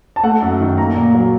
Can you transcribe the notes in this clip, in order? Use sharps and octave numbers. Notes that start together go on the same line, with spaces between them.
A5
A3 F#5
F#2
D#3
A#3 A#5
A#2
F#3